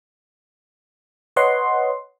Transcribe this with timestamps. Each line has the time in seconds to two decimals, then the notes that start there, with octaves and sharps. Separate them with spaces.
1.36 B4 C#5 D#5 F#5 C6